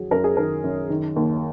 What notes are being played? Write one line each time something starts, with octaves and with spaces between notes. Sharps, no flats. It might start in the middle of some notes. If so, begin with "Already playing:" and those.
Already playing: F#2 D#3 F#3 G#4
F#2 A#4
G#4
D#3 A#4
F#2
D#3
D#2